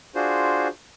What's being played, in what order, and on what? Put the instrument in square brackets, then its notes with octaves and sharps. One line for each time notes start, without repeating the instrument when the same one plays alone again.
[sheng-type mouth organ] D4 F4 F#4 G#4 C5